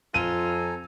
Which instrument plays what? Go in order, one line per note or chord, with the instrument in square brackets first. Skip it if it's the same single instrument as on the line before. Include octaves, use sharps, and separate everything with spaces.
[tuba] F2 [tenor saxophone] F4 [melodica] A4 G#5 A#5 [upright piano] D#7